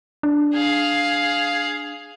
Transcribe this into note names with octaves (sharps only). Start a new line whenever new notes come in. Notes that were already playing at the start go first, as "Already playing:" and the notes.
D4
G#4 F5